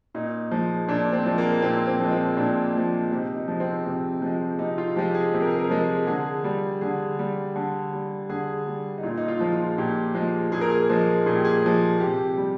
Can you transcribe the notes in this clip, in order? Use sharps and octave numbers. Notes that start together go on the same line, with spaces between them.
A#2 D#4
F3 G#3
A#2 D4
C4
F3 G#3
A#3
A#2 C4
C4
F3 G#3
C4
A#2 D4
F3 G#3
C3 D#4
D#4
F3 G#3
C4
C3 D#4
F3 G#3
C3 D#4
F4
F3 G#3 G4
G#4
C3
A#4
G#4
A#4
F3 G#3
D3 G#4
G3
D3 G#4
G3
D3
G3
D3 G#4
G3
D#4
A#2 F4
D#4
F4
F3 G#3
F4
A#2 G4
F3 G#3
A#2 G#4
A#4
G#4
F3 G#3
A#2 G#4
G4
G#4
F3 G#3
C3 G4
G3